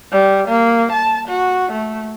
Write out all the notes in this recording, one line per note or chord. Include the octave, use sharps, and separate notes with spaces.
G3
A#3
A5
F#4
A3